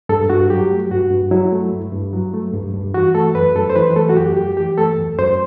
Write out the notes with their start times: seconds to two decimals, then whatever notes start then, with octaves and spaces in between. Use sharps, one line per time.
0.09 G2 A4
0.30 G2 F#4
0.50 F#3 G4
0.70 A3
0.91 G2 F#4
1.11 G2
1.31 F#3 E4
1.52 A3
1.72 G2
1.93 G2
2.13 F#3
2.33 A3
2.53 G2
2.74 G2
2.94 E3 F#4
3.15 A3 A4
3.35 F#2 B4
3.55 F#2 A4
3.70 C5
3.76 E3 B4
3.96 A3 A4
4.09 F#4
4.16 F#2 G4
4.37 F#2 G4
4.57 E3 G4
4.78 A3 A4
4.98 F#2
5.18 F#2 C5